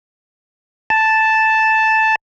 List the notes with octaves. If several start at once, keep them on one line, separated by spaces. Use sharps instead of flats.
A5